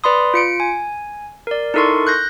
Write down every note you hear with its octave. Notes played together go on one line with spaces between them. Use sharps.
B4 D5 B5 C6 D#6
F4 C#7 D7
G#5
A#4 D5
D#4 E4 A4 A#4 C6 C#6
F#6 G6 A#6